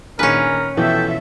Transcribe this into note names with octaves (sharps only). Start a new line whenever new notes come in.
A#2 D#3 C#4 D4 F4 G#4 A#4 B4
B2 E3 F3 A4 E5 G5